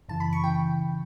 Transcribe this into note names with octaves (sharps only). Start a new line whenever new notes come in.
F#2 C#3 E3 A5
B5
C#6
C#3 E3 G5